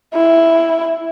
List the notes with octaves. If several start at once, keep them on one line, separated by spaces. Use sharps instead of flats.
E4